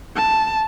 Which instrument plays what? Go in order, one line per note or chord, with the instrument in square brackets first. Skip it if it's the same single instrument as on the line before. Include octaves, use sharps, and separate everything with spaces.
[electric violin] A5